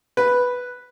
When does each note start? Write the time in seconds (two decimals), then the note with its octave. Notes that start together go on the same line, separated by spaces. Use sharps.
0.17 B4